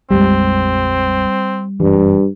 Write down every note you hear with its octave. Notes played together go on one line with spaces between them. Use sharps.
A#1 F2 G3 G#3 C4
F#1 G2 E3